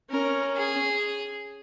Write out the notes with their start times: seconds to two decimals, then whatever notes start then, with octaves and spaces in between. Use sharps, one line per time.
0.11 C#4 A#4
0.57 G#4